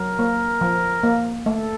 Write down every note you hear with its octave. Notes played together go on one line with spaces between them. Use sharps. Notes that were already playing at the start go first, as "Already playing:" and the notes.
Already playing: F#3 A#4
A#3
F3
A#3
A3 A4